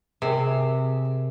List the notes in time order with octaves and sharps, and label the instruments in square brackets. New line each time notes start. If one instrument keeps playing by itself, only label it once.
[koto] C3 [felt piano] G#4 A#4